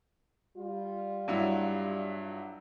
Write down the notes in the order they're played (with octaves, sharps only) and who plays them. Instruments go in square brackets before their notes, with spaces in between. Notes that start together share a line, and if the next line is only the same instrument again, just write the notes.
[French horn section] G3 F4
[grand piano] G2 F#3 E4